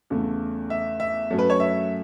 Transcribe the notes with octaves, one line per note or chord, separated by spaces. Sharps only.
E2 C#3 A3
E5
E5
F#2 F#3 A3
B4
C#5
E5